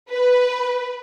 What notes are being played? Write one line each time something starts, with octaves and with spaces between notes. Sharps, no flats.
B4